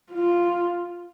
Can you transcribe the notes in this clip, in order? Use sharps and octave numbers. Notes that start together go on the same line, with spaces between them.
F4